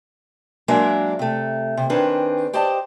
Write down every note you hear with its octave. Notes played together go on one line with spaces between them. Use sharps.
F#3 G#3 A#3 D4 A#4 E5
C3 A3
C3
D#3 C4 D4 G#4 B4
G4 C5 D5 D#5 A5